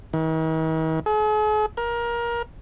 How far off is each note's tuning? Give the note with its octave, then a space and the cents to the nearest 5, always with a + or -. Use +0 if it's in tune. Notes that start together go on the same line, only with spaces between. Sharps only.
D#3 +45
G#4 +45
A#4 +20